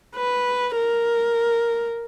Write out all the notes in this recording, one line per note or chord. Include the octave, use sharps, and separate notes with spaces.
B4
A#4